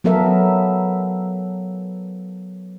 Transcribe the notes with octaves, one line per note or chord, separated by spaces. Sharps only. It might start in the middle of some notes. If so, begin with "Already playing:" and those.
F#3 B3 A4 A#4 E5